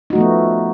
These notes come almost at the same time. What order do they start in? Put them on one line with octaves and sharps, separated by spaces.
D#4 F#4 A3 F3 B3